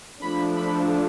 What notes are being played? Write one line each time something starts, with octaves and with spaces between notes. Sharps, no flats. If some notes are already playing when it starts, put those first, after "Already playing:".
F3 A3 D4 B5
B5